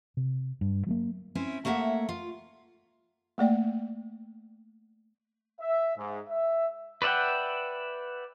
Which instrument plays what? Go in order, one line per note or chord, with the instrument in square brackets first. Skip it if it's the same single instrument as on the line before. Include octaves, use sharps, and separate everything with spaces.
[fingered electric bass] C3
G2
F#3 G#3 A#3
[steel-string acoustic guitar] C4 C#4 E4
A3 A#3 C#5 D#5 E5 F#5
F4
[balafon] A3 A#3 D5 G5
[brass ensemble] E5
G#2
E5
[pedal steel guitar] B4 D5 E5 F#5 G5